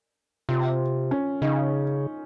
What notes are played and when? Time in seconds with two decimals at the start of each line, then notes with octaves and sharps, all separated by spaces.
0.49 C3 F4
1.11 C#4
1.42 C#3 D#4